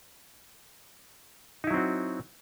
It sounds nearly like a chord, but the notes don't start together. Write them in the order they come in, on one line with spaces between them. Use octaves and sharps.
D#4 E4 F#3 C4 F#4